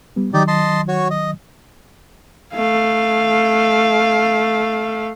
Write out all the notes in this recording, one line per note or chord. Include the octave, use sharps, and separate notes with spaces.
G3 B3
D#3 F#3 D#4 G4 D5
D#5 A5 C6
F#4 C#5
D#5
A3 F5